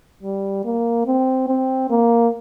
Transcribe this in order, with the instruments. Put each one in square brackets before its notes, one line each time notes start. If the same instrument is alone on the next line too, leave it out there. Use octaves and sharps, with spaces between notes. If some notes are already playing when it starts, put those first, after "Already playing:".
[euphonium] G3
A#3
C4
C4
A#3